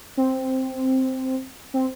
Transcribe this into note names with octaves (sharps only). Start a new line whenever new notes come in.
C4
C4